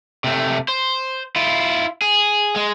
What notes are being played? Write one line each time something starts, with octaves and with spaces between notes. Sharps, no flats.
C3 A3
C5
E4 F4
G#4
G#3